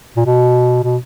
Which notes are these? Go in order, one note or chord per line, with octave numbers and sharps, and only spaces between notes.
A#2
B2
B2